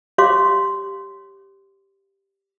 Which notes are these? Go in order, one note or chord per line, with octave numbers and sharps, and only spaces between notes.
G4 C#5 F5 C6 D6